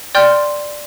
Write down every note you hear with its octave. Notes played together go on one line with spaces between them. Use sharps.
D5 G5 C6 F6 G6